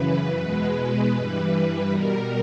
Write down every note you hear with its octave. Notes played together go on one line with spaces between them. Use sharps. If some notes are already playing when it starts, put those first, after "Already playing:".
Already playing: F#2 C#3 E3 B4
E2 B2 G#3 B4
G2 E3 G3
B2 G3 A#4